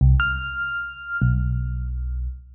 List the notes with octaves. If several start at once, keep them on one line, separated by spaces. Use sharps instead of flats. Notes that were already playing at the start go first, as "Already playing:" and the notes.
C2
F6
B1